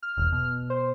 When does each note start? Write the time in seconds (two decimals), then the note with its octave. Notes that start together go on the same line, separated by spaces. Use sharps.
0.03 F6
0.18 E1 B1
0.32 B2
0.70 C5